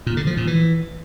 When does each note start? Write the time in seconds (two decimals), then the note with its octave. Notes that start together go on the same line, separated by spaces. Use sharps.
0.07 A#2
0.17 D3
0.27 F3
0.37 A#2
0.47 E3